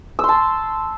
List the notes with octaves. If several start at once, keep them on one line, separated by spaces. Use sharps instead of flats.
A5 C6 E6